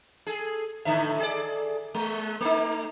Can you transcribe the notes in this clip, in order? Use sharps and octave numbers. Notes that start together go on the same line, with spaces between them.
G#4 A4
A2 D3 E5
G#4 A4 D5
G#3
A3 D#4